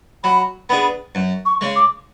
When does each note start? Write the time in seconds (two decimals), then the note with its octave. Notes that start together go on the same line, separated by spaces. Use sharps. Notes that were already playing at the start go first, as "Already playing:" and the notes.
0.24 F#3 B5
0.69 B3 D4 G#4 B5
1.15 F#2
1.46 C#6
1.61 C#3 G#3
1.76 D6